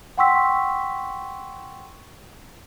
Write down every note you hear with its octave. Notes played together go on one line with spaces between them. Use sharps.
F#5 G5 C6 C#6 E6 B6